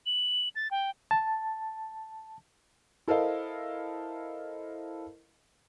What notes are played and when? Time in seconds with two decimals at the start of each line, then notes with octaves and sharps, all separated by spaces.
0.06 F#7
0.55 A6
0.71 G5
1.11 A5
3.08 E4 A4 A#4 C5 D#5 F5